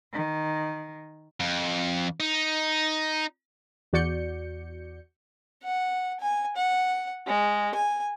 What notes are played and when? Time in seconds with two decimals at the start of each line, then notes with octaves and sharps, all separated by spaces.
0.14 D#3
1.40 F2
2.20 D#4
3.93 E2 F#4 D5 G6 C#7
5.64 F#5
6.20 G#5
6.57 F#5
7.27 G#3
7.75 G#5